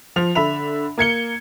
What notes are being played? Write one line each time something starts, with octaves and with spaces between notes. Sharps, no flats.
F3 F7
D3 E5 B5 F7
A#3 G#6 C#7 G7